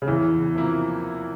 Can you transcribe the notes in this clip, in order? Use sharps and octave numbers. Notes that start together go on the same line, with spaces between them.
C#3
E2 E3
C3 F3 A#3 E4